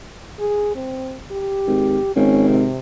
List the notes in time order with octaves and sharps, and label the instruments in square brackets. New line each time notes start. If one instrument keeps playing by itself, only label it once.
[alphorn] G#4
C4
G4
[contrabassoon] G#1
[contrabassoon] G#1 [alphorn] C#4
[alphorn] C3